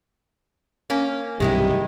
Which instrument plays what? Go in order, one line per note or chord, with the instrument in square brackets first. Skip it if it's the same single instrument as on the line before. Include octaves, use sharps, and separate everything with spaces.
[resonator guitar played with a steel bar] A#3 C#4
[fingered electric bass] B1 G2 C3 [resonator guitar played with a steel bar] D#3 G#3 E4 [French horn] G4